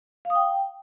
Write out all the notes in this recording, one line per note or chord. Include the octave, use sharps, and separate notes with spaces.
F5
D#6
G5